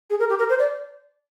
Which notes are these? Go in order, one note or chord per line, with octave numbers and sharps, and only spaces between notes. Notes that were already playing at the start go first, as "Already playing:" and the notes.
G#4
A#4
G4
A#4
C5
D5